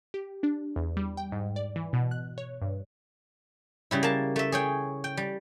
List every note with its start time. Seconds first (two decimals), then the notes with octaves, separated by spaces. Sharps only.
0.14 G4
0.43 D4
0.76 E2
0.97 G3
1.17 G5
1.32 G#2
1.56 D5
1.76 E3
1.93 B2
2.11 F#6
2.38 C#5
2.61 G2
3.91 C#3 G3 E4
4.03 A#3 A5
4.36 A3 E5
4.52 G#4 C#5 G5
5.04 G5
5.17 G3